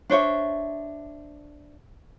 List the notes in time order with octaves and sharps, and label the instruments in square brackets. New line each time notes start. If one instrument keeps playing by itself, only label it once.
[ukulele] D4 C5 C#5 E5